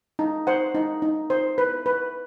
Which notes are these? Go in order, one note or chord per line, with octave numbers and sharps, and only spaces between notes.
D#4
C5 F#5
D#4
D#4
C5
B4
B4